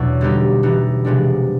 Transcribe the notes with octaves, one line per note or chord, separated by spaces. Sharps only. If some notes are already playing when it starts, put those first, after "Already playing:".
Already playing: E2 B2 F#3 D4 E4
D3 G3 B3 D#4 G4
E3 G3 B3 D#4
C3 F3 G#3 B3 D4